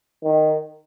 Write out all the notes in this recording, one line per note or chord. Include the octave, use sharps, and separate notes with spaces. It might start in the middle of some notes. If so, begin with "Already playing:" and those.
D#3